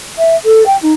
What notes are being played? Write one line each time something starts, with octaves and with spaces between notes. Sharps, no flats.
E5
A4
G5
D#4